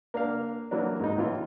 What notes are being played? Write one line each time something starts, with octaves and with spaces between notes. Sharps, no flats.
A#3 D4 F5
E3 F#3 A#3 D4
G#2 D#4
A2 E3 F4